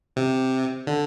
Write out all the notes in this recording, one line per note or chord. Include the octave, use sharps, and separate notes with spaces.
C3
D3